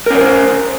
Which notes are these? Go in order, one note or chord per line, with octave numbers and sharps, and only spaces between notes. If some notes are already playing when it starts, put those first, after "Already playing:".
C#4 A#4 C5 C#5